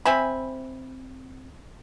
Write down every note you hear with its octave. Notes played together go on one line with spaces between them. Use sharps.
C4 E5 G#5 B5